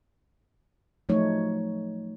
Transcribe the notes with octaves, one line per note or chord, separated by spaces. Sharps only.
F3 F#3 A3 D#4 C#5